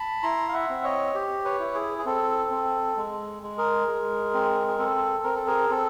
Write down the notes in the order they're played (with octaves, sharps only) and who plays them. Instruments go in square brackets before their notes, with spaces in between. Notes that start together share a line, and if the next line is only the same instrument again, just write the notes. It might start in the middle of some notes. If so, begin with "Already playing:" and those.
Already playing: [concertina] A5 B5
E4 A#5 C6
F5
E5 F#5
C4
C#5 D#5
G4
B4 C#5
E4
G#4
G#4
C4 A4
C4
G#3
G#3
G#4 A#4
G#3
C4
G#4
C4 A4
C4 A#4
A4
G#4 A#4
C4 A4